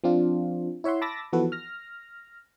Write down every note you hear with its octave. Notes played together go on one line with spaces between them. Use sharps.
F3 C4 D4 F4
E4 C#5 E5 F#5 C6
A5 B5 D6 E6 A6 A#6
E3 F3 B3 F#4 A4 B4
F6 A#6